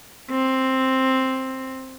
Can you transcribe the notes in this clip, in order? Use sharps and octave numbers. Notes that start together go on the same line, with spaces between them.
C4